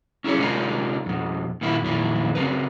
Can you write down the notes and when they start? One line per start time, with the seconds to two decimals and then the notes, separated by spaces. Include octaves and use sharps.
0.24 C#4 E4 G4 G#4 C#5
0.39 C3 G#3 D4 D#4 F4 A#4
1.06 F2 B2
1.61 A#2 D#3 A#3 E4
1.82 F2 A#2 D#3 E4
2.35 C#3 C4 D#4 A#4 B4